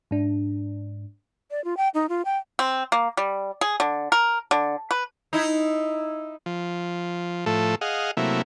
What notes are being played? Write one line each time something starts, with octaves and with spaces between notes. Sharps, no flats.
G#2 D4
D5
F4
G5
D#4
F4
G5
C4
A#3
G3
G#4
D3
A#4
D3
B4
D#4 E4
F3
A2 F3 A3 A4
G#4 D#5 F5 F#5
C3 F#3 A3 A#3 E4